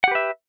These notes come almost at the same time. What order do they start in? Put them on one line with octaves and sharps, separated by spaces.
F#5 G4 B4 E5